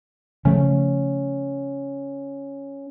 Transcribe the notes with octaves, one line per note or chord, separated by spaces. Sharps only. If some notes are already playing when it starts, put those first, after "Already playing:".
C#3 F3 A3 C#4